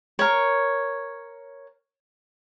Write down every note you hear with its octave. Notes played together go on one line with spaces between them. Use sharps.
A#4 C#5